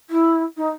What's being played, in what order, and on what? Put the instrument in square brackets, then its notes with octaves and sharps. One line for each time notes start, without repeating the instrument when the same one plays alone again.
[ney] E4
D#4